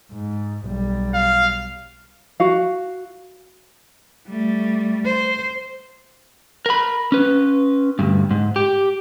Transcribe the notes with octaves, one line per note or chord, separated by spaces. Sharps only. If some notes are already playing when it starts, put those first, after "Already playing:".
G#2
B1 G3
F5
F#4 F5
G3 A3
C5
A#4 B5
C#4 B4
D2 G2
G#2
G4